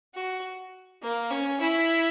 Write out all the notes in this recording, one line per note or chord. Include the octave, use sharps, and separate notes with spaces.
F#4
A#3
C#4
E4